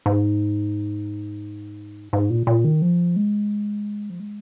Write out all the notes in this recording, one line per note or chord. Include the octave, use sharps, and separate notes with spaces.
G#2
G#2
A#2
A#2
D#3
F3
G#3
F3
G#3